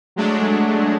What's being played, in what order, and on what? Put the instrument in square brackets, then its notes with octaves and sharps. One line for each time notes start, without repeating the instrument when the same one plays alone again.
[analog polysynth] F#3 G#3 A3 D4